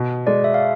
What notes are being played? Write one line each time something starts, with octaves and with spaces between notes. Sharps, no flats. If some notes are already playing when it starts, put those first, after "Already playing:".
Already playing: B2
G#3 D5
E5
F5